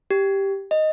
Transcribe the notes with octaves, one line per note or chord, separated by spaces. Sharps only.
G4
D#5